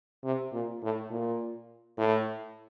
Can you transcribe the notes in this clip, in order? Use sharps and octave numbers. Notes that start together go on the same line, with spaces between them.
C3
A#2
A2
A#2
A2